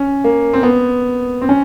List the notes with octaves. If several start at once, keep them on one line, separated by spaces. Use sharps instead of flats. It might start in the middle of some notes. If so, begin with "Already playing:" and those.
Already playing: C#4
A#3
C4
B3
C4
C#4